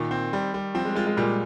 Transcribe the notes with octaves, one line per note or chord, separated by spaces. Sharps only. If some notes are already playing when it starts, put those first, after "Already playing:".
Already playing: A#2 D#3
C4
G3
G3
F3 C4
G#3
G#3 F4
G#3
A#2 G3